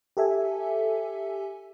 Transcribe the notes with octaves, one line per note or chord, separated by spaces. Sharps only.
G4 A4 E5 G#5